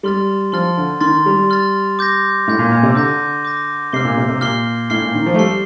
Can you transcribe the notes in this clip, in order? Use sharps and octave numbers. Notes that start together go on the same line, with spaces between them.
G3 C6 F6 A6
F3 C6 F6 A6
D3
D#3 C6 F6 A6
G3
C6 F6 A6
D6 G6 A#6
A2 D6 G6 A#6
A#2
A#2
C3
D3 D6 G6 A#6
D6 G6 A#6
C3 F6 C7 G7
A#2
C3
C3
A#2 F6 C7 G7
A2 F6 C7 G7
A#2
D#3
F3
A3
G3 F6 C7 G7